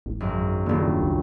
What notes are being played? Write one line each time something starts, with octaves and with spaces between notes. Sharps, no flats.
A1
G#1 F#2
D#1 D3 A#3
C#2